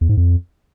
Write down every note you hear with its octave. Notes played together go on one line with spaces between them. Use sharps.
E2
G#2
F2